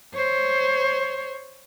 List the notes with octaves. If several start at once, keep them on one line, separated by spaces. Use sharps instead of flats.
C5 C#5